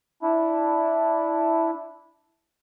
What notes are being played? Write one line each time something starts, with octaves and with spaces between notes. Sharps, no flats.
D4 E4